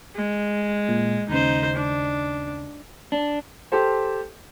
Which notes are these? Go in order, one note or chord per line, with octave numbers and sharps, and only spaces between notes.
G#3
A#2
D#2 C#3 D#4 C5
D4
D4
G4 A4 C5